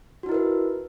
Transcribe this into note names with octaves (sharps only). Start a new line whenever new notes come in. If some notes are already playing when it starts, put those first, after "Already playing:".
D#4 E4 F#4 A#4 B4